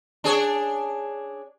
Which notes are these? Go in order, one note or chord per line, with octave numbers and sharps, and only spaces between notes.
D4 G#4 C#5